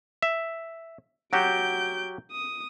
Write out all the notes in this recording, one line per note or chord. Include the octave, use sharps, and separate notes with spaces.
E5
F#3 F#4 G4 G6 D7
D#6